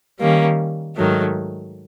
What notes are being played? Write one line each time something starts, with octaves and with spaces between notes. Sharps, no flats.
D#3 G3 A#3 C#4
G#2 D#3 F#3 A3